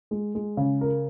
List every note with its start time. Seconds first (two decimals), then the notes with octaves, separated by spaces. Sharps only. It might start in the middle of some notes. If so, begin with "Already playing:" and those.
0.11 G#3
0.35 G#3
0.57 C#3
0.81 A#4